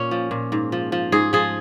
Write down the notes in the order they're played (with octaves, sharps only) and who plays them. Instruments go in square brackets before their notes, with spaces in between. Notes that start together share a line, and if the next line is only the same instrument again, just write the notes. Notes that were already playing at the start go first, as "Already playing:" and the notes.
Already playing: [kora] A#2 C#4
F3
A#2
G#2
F3
F3
G#2 G#4
F3 G#4